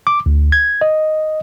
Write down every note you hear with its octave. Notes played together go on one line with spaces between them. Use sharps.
D6
D2
G#6
D#5